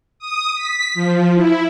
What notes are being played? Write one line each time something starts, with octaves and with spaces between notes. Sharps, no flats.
D#6
B6
F3
E4